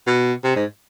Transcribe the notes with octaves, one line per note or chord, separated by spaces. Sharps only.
B2
C3
G#2